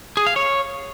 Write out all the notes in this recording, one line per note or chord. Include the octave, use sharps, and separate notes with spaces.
G#4
F5
C#5